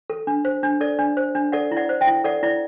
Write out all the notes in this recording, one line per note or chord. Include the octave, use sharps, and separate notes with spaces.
A4
D4
C5
D4
A4 D5
D4
C5
D4
A4 D5 F#5
E4
D5 F#5
C5
E5 G5
E4
A4 D5 F#5
E4 D5